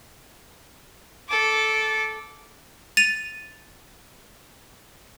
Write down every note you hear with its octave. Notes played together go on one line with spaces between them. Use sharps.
A4 D6
A6 D#7 F7